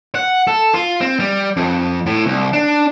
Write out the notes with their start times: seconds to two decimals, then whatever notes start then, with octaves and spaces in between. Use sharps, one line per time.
0.15 F#5
0.47 A4
0.74 F4
1.01 C4
1.20 G3
1.57 F2
2.06 A2
2.26 C2
2.53 D4